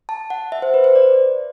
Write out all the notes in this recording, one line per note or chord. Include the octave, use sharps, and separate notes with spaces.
A5
F#5
E5
C5
B4
C5
D5